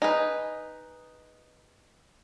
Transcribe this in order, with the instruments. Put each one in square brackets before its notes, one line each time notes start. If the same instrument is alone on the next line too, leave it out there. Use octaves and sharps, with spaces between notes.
[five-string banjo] D#4 G#4 B4